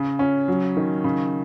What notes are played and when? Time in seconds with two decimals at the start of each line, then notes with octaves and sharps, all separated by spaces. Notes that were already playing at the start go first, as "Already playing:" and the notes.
Already playing: C#3
0.19 C#4
0.48 F#3
0.77 D#3
1.04 C#3